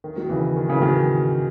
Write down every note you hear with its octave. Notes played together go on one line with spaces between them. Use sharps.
D#3
D#3 F#3
C#3 E3
D#3
C#3 E3
D#3 F#3